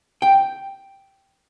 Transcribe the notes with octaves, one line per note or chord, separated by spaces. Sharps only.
G5